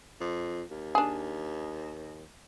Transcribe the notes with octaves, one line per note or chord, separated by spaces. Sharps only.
F2
D#2
D4 G#4